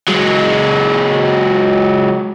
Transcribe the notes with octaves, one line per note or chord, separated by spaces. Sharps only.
F#3 G#3